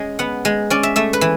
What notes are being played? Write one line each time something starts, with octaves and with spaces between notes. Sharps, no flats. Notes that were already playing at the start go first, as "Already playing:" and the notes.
Already playing: G#3 C#4
B3 F#5
G#3
C#4 D5
E5
A3 E5
B4
E3